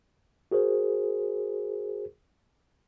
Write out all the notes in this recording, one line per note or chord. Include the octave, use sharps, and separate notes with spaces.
F#4 G#4 A#4 C5